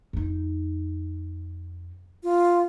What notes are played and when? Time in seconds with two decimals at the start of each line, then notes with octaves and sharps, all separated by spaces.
0.13 F2 D#4
2.23 F4